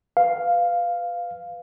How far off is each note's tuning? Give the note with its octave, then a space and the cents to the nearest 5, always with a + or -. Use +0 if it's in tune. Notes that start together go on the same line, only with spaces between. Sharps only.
B4 +10 F5 +0